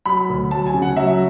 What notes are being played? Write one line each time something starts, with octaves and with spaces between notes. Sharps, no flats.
F#3 B5
D2
F#3 A5
G#5
C#3
F#5
F#3 E5